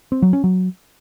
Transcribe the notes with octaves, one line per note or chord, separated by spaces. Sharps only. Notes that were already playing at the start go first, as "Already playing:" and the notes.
C4
F#3
C#4
F#3